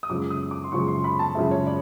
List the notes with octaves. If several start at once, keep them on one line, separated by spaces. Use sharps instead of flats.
D#6
F#2 C#3 F3 G#3 D6
D#6
D6
C6
F#2 C#3 F3 G#3 C#6
C6
B5
A5
F#2 C#3 F3 G#3 E5
C#5
D5